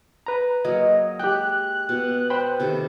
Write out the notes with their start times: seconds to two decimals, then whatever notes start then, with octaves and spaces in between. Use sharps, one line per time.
0.27 B4 A#5
0.64 F#3 A#3 G#4 D#5
1.19 G#3 G4 G5 F#6
1.89 B2
2.30 C5 G5 B5
2.60 C3 D#3 A4